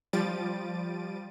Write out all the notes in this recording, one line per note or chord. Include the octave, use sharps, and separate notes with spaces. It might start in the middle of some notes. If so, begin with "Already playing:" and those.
F3 G3 A6 D7 D#7